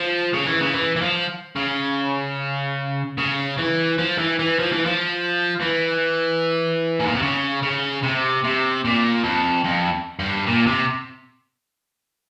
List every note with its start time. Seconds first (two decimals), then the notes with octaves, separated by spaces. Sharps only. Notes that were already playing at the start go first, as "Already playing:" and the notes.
Already playing: F3
0.34 C#3
0.47 E3
0.61 C#3
0.74 E3
0.96 E3
1.01 F3
1.56 C#3
3.18 C#3
3.58 E3
3.98 F3
4.18 E3
4.39 E3
4.59 F3
4.72 E3
4.85 F3
5.60 E3
7.00 G#2
7.07 A#2
7.15 C3
7.22 C#3
7.63 C#3
8.03 C3
8.44 C3
8.85 A#2
9.24 F2
9.65 F2
10.19 G2
10.47 A#2
10.67 C3